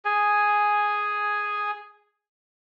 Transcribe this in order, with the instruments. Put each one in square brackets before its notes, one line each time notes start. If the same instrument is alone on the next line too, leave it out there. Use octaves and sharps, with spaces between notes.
[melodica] G#4 G#5